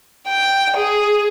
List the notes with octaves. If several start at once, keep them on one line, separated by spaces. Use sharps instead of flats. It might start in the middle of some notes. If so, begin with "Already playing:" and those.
G5
G#4